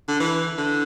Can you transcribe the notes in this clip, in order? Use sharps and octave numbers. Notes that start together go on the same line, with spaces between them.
D3
E3
D3